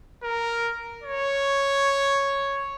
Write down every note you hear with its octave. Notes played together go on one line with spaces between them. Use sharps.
A#4
C#5